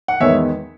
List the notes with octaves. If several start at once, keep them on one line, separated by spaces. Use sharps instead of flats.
F#5
E2 D#3 G#3 B3 C#5 E5